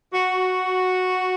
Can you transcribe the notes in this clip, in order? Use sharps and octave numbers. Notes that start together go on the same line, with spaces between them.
F#4